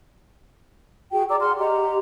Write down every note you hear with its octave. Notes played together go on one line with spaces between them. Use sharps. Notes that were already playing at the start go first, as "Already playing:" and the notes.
F#4 G#4 G5
D5 A#5 D6 E6
G#4 F#5 C6 F6
G4 D#5 F#5 A#5